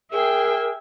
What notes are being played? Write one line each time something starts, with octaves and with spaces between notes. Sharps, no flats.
G#4 A#4 E5 G5 C7